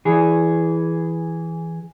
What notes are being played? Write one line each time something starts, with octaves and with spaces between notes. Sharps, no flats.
E3 G#4